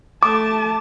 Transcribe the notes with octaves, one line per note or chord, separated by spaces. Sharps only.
A3 A5 D6